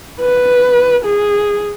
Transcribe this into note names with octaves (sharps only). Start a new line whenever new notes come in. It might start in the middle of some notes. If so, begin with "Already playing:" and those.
B4
G#4